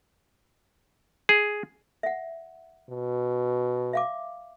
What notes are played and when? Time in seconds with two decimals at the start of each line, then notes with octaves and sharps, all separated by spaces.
1.29 G#4
2.03 E5 F#5
2.89 B2
3.93 E5 F5 D6